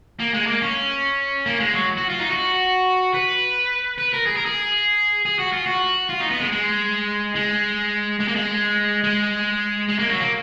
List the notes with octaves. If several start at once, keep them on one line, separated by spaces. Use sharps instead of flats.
A#3
G#3
A#3
C#4
A#3
G#3
F#3
F#4
F4
D#4
F#4
B4
B4
A#4
G#4
A#4
G#4
G#4
F#4
F4
F#4
F4
D#4
B3
G#3
G#3
G#3
G#3
A#3
G#3
G#3
G#3
A#3
F#3
A#3